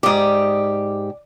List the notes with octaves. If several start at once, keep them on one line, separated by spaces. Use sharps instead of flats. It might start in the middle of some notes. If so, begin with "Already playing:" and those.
G#2 G4 D5 D#6